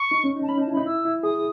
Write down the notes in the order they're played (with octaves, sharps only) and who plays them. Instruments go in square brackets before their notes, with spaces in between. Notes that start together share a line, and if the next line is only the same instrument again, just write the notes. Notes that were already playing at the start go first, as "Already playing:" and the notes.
Already playing: [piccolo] C#6
[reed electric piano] D#4
C#4
D#4
[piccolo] A5
[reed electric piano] C#4 [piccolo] B5
[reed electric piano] D#4
[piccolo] A5
[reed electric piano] E4
[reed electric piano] D#4 [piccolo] B5
[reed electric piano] E4 [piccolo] E6
[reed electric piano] E4
[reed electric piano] G#4 [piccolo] D#6